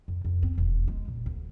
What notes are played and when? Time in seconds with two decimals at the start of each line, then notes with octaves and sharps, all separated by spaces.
0.08 F2
0.25 F2
0.43 C4
0.58 E1
0.88 G#3
1.08 A#2
1.26 D2